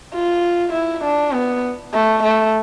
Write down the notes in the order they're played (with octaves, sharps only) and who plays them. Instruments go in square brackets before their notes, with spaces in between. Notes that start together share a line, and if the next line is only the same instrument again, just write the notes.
[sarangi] F4
E4
D4
B3
A3
A3